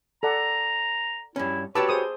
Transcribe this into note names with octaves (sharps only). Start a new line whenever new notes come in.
A4 D5 F#5 A#5
G2 C#4 E4
F#4 G4 B4 C#5 A5 D6 E6
G#4 C5 D#6